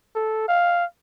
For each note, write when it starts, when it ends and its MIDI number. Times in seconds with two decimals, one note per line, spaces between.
0.15 0.44 69
0.48 0.84 77